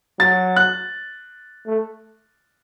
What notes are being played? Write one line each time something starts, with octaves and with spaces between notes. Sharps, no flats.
F#3 A6
F#6
A3